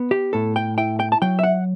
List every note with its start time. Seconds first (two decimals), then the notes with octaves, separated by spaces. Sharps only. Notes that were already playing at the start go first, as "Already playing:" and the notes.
Already playing: B3
0.11 G4
0.33 A2 A4
0.56 G5
0.78 E4 G5
1.00 G5
1.12 A5
1.22 F#3 G5
1.39 E5
1.43 F#5